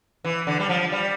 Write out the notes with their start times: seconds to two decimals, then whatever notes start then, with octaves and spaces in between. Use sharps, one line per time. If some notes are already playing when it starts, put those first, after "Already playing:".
0.25 E3
0.47 D3
0.59 G3
0.69 F3
0.92 G3